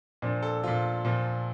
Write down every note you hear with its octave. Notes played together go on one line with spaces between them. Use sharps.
A#2 F3 D4
A4
A#2 F3 F4
A#2 F3